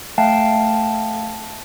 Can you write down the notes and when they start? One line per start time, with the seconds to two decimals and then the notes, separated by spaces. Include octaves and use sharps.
0.18 A3 F5 G5 A5